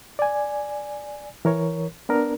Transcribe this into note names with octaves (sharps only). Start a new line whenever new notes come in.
D5 G#5
E3 A#4 C#5
B3 D4 A#4